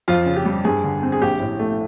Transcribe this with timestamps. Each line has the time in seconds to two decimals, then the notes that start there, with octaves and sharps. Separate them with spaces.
0.08 F2 F4
0.26 C#3
0.36 G4
0.46 G3
0.64 G2 G#4
0.84 D3
1.03 C4
1.12 G#4
1.22 A#1 G4
1.40 A2
1.59 A3